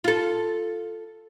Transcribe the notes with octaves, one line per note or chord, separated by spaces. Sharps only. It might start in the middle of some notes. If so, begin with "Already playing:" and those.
F4 A4